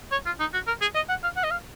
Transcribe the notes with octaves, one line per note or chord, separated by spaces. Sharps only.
C#5
F4
D#4
F#4
A#4
G#4
D#5
F#5
F5
F#5
D#5
F5